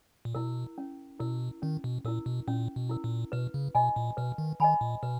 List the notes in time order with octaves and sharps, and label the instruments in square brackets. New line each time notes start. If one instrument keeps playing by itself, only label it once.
[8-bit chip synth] A#2
[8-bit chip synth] B2 [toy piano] E4 A#4
[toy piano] C#4
[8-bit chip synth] B2 [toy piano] E4 A#4
[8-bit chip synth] D#3 [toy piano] C#4
[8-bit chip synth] B2
[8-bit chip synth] A#2 [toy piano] E4 A#4
[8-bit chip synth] B2
[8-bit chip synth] A#2 [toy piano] C#4
[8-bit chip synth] B2
[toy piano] E4 A#4
[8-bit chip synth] A#2
[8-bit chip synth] B2 [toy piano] B4
[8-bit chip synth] C#3
[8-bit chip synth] B2 [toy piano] D#5 G#5 B5
[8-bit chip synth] A#2
[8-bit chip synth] B2 [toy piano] B4
[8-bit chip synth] D#3
[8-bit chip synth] D#3 [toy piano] D#5 G#5 B5
[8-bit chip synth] A#2
[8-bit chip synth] B2 [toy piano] B4